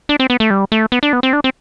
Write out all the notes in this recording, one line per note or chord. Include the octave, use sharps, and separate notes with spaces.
D4
C4
B3
A3
G3
A3
B3
D4
B3
C4
D4
C4